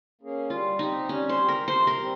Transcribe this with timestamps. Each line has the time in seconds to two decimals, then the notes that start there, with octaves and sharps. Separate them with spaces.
0.21 A#3 C#4 G#4
0.50 G3 F4
0.79 C4 D#4 G4
1.09 G3 C#4
1.29 C5
1.39 C4 G4
1.48 A#4
1.68 C3 C5
1.87 A#4
1.98 G3 C4